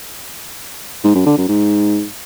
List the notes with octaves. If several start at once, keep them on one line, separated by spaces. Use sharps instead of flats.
G#2
F#2
D3
F#2
G#2